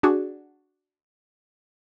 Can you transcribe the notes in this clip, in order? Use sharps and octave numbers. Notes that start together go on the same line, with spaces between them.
D4 F#4 G#4